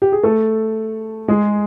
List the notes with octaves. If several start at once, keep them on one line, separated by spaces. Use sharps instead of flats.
G4
G#4
A3 A4
G#3 G#4